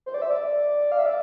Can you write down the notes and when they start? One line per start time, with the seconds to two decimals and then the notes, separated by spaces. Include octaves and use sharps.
0.06 C5
0.14 D5
0.22 E5
0.30 D5
0.92 F5
0.99 E5
1.06 D5